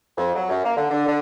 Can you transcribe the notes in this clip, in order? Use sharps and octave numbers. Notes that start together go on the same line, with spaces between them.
F2
F#3
F#2
A#3
D3
D3
D3